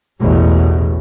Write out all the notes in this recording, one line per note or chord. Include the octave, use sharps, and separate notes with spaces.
A1 E2 B2